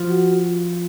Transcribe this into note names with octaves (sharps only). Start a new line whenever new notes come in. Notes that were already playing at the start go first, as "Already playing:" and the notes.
Already playing: F3
F#4
F4